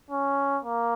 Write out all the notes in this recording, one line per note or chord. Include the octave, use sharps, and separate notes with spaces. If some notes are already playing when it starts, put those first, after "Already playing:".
C#4
A#3